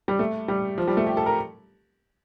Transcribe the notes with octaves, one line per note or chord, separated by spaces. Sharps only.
G3
A3
G3
F3
G3
A3
G4
A4
A#4